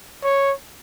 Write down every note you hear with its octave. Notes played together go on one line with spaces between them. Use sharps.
C#5